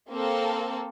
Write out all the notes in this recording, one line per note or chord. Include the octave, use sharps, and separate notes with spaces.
A#3 C4 A4